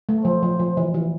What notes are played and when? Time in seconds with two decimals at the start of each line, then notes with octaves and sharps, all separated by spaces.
0.09 A3
0.25 F3 C5
0.43 F3
0.59 F3
0.77 E3
0.94 E3